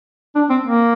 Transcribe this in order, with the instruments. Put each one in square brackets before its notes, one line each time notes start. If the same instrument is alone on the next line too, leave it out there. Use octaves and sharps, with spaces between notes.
[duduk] D4
C4
A#3